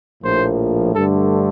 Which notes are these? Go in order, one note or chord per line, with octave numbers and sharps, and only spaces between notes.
A#1 A2 F3 A#3 C5
G2 D3 A3 A4